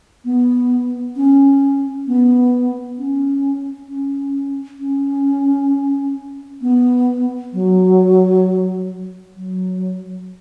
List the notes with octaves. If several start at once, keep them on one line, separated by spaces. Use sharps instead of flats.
B3
C#4
B3
C#4
C#4
C#4
B3
F#3
F#3